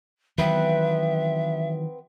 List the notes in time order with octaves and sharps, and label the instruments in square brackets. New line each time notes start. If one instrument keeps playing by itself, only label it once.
[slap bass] D#3 E3 F#3 [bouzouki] B3 C4 B4 [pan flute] E5